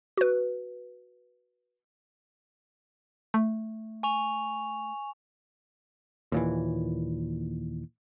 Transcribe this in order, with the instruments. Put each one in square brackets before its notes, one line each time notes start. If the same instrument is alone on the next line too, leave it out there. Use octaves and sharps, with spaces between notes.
[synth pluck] F#4 B4
[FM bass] A3
[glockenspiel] G#5 C#6 F7
[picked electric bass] D#2 A#2 E3